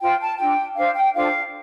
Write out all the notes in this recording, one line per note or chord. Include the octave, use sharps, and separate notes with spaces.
F4 C5 G5
A5
D4 F4 A4 G5
D4 A4 C5 F5
G5
D4 F4 A4 C5 F5